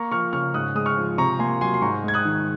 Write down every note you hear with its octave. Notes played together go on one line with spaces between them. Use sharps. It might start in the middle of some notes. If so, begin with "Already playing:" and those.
Already playing: A#3 A#5 C#6
F3 C#6 F6
C#3 C#6 F6
G#2 D#6 F#6
G#3 D#6
C#6 F6
F3
C3 A#5 C#6
A#3 G#5 C6
F#3 G#5 C6
C6
G#2 A#5 C#6
G#3 G#6
D#6 F#6
D#3